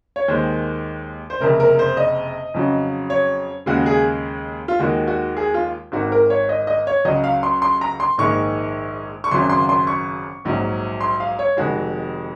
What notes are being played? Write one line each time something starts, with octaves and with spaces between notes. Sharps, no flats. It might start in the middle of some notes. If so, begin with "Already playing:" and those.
C#5
D#2 D#3 G#3 C5
C5
F#1 F2 C3 A#4
A#4
A#4
C5
D#5
F2 C#3 F#3
C#5
D#2 C#3 G#3 F#4
G#4
F4
D#2 D#3 G#3 F#4
F#4
G#4
F4
G#1 G#2 D#3 F#4
A#4
C#5
D#5
D#5
C#5
C#2 C#3 F#3 D#5
F5
C6
C6
A#5
C6
A#1 G#2 D#3 G#3 C#6
C#6
G#1 F#2 C#3 F#3 C6
C6
C6
C#6
A#1 G#2 F#3
C6
F5
C#5
F1 F2 D#3 G#3 F#4